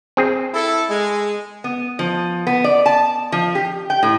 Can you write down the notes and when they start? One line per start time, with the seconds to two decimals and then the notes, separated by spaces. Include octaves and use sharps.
0.17 C4 G#4
0.54 E4 A4
0.90 G#3
1.64 B3
1.99 F3
2.47 B3
2.64 D5
2.86 A5
3.32 F3
3.55 G4
3.90 G5
4.03 A2